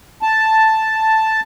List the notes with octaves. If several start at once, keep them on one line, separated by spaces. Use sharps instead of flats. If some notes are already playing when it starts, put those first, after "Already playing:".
A5